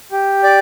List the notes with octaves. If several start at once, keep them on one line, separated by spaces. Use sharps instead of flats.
G4
D5